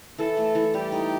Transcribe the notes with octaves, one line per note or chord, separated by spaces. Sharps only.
E3 A4
A3
E3
G3 G4
D#4